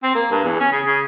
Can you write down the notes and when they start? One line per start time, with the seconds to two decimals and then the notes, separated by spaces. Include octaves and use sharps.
0.03 C4
0.15 A#3
0.31 G2
0.44 E2
0.59 C#4
0.72 C#3
0.86 C#3